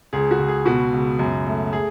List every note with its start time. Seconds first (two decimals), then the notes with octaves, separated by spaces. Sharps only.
0.13 C#2 G#4
0.31 F#4
0.39 C#2
0.48 G#4
0.66 B2 F#4
0.92 C#2
1.19 F#2
1.46 A3
1.73 G#4